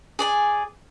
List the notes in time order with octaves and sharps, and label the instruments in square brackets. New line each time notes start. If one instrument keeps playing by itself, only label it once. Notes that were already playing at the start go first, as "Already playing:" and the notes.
[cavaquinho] G#4 D5 G#5